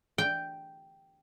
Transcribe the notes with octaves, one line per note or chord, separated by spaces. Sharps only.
G5